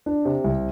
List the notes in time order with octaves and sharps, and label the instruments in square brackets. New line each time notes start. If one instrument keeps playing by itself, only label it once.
[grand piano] D4
C3
C2